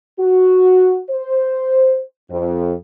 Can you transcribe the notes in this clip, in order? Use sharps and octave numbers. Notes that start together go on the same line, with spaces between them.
F#4
C5
F2